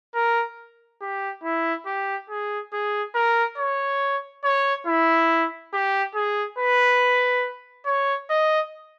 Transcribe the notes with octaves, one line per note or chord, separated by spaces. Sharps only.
A#4
G4
E4
G4
G#4
G#4
A#4
C#5
C#5
E4
G4
G#4
B4
C#5
D#5